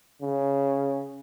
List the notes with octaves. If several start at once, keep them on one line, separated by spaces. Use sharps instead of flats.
C#3